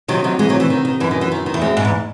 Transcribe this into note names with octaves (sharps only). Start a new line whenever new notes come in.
C3 D#3 F#3
D#3 F#3
E3 G#3
D#3 F#3
E3
D#3
D#3
F#2 E3
D#3
E3
D#3
D#3
E2
F#2 G#3 C4
G#2
E2